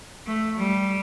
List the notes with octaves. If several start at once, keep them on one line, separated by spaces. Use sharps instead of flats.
A3
G3